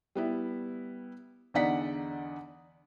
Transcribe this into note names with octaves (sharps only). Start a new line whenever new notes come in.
G3 B3 E4
E2 D3 D#4 D5 F#5 B6